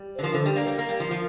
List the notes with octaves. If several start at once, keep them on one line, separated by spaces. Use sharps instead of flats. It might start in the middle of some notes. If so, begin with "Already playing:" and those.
Already playing: G3
C5
D3
F3 A#4
D3 C5
G3
A#3 D5
G3 A#4
A#3
G3
F3
F3